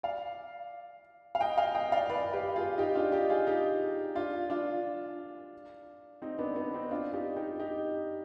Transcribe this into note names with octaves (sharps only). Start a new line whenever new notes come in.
D5 F5
F5
D#5 G5
F5 G#5
D#5 G5
D5 F5
B4 D5
G4 B4
F4 G#4
D#4 G4
D4 F4
D#4 G4
F4 G#4
D#4 G4
D4 F4
D4 F4
C4 D#4
B3 D4
B3 D4
C4 D#4
D4 F4
D#4 G4
D#4 G4
D#4 G4